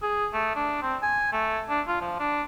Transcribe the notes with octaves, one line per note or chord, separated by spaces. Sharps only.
G#4
A3
D4
C4
G#5
A3
D4
F4
F3
D4